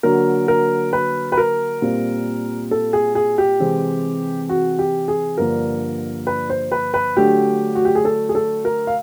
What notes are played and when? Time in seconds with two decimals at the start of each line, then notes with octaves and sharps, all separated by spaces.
0.03 D3 F#3 A#3 A#4
0.48 A#4
0.93 B4
1.32 B4
1.38 A#4
1.82 A#2 G3 C4 F4
2.71 A4
2.93 G#4
3.15 G#4
3.38 G4
3.60 C3 E3 G#3 C4
4.49 F#4
4.79 G4
5.08 G#4
5.38 G2 D3 F3 A#3 D4 A#4
6.27 B4
6.50 C5
6.72 B4
6.94 B4
7.16 D3 F#3 A3 D4 G4
7.75 F#4
7.85 G4
7.95 G#4
8.05 A4
8.29 G#4
8.35 A4
8.65 A#4
8.87 F5